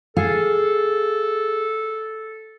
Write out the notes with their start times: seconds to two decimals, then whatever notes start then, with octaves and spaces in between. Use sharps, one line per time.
0.17 G#4 A4 F5